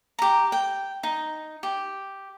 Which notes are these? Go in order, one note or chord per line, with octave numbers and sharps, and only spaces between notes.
G4 A#5
G5
D#4
G4